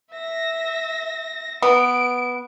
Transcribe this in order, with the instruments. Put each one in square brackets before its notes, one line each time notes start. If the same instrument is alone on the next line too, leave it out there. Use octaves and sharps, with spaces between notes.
[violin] E5 A#6
[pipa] B3 [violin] D7